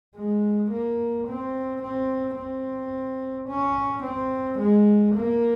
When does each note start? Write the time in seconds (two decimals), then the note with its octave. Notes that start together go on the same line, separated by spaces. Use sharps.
0.16 G#3
0.71 A#3
1.27 C4
1.82 C4
2.37 C4
3.49 C#4
4.03 C4
4.59 G#3
5.14 A#3